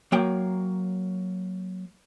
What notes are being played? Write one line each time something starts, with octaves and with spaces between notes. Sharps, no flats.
F#3 A#3 G5